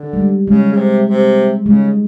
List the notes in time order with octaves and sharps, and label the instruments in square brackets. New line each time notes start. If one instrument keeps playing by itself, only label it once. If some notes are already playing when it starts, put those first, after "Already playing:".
Already playing: [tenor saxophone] D3
[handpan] G3
G#3
[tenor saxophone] C#3 [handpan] G#3
[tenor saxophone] C#3
C3
C3
[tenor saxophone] C#3 [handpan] G#3